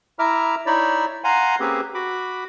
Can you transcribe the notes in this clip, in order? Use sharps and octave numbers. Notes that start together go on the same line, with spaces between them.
E4 E5 A#5 D6 F6
D#4 E4 C#5 D5 B5
F5 F#5 G#5 A#5 C6
A#3 C4 C#4 G4 G#4 B4
F#4 B5 D6